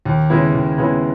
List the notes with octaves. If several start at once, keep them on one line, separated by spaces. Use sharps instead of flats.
D#2
C#3 G#3 B3 E4
D#2
C#3 G#3 B3 E4